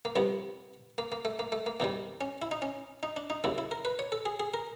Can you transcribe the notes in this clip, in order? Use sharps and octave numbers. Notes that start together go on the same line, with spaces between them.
A#3
C2 C3 F3 B3
A#3
A#3
A3
A#3
A3
A#3
E2 C3 D#3 G3 A#3
C#4
E4
D#4
C#4
D#4
D4
D#4
D#2 C#3 F#3 E4
E4
A#4
B4
C#5
A4
G#4
G#4
A#4